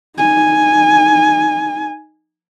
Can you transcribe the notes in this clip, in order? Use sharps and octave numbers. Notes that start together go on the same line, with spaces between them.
D#4 G#5